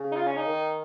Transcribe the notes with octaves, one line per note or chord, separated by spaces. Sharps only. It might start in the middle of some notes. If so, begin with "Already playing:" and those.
Already playing: C#3
D#4
F4
C#4
D#4
D#3